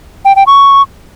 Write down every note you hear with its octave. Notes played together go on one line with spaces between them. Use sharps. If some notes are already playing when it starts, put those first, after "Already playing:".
G5
G5
C#6